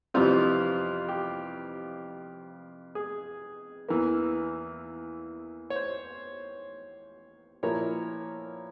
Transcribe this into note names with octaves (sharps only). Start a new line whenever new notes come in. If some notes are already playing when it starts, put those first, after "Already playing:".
F2 C3 E3 G3 C4 F4
G4
G#4
E2 E3 A#3
C#5
C5
A#2 F3 A#3 E4 C#5